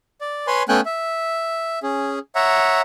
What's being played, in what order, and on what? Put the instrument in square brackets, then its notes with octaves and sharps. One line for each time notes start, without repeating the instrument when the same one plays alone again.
[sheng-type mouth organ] D5
B4 C#5 G#5 C6
A3 B3 C#4 G5 G#5 F#6
E5
C#4 G#4
C#5 E5 F#5 A#5